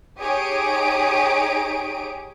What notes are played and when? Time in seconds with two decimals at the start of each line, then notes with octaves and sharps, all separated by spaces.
0.19 D#4 G4 G#4 C#5 D#6 D7